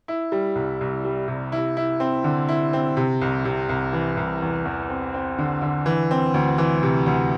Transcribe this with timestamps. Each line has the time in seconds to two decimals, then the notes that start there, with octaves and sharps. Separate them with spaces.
0.08 E4
0.32 G3
0.55 C2
0.81 C2
1.05 G3
1.28 C3
1.52 E4
1.77 E4
2.00 C4
2.24 D3
2.48 E4
2.73 C4
2.97 C3
3.21 C2
3.45 C3
3.69 C2
3.93 E3
4.17 C2
4.42 E2
4.65 E2
4.89 C4
5.14 C4
5.38 D3
5.62 D3
5.86 E3
6.11 C4
6.34 D2
6.58 E3
6.83 C3
7.06 D2